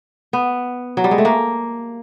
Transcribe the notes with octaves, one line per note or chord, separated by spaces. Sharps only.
B3
F#3
G3
G#3
A3
A#3